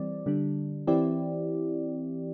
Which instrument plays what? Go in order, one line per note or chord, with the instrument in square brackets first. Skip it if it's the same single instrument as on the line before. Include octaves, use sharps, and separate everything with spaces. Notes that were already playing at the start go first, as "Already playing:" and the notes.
Already playing: [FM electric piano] E3 G3 C4 D5
D3 G3 D4
E3 C4 E4 G4 D5